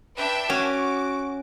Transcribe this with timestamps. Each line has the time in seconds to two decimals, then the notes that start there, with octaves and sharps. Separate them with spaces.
0.17 D4 B4 E5 G5
0.50 C#4 F#4 D6